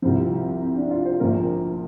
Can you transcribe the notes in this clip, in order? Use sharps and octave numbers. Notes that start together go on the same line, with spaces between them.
C2 C3 F3 C4
C4
D4
F4
C5
A#1 A#2 F3 A#4